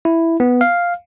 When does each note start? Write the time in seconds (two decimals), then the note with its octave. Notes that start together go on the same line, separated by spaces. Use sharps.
0.05 E4
0.40 B3
0.61 F5